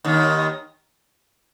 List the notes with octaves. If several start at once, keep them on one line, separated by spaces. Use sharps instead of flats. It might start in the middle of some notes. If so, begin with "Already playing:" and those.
D#2 D#3